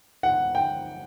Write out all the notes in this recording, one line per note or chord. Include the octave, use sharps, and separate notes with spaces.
F#5
G5